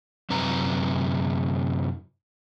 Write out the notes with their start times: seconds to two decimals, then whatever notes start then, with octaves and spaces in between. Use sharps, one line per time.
0.30 F#2 C3 B4 A#5